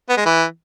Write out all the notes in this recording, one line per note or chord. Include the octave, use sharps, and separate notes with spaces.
B3
G#3
E3